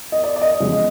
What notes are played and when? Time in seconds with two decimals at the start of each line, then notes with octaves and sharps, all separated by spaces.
0.12 D#5
0.24 D5
0.36 D5
0.42 D#5
0.60 E2 C#3 E3 G#3